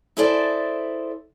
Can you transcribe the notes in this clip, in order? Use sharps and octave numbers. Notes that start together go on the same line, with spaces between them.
E4 G#4 A4 C5 D5 E5